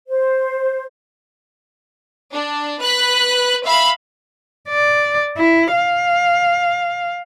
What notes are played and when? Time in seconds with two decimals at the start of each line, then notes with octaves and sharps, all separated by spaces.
0.09 C5
2.31 D4
2.80 B4 F#6 B6
3.64 E5 F5 B5
4.69 D5
5.38 E4
5.73 F5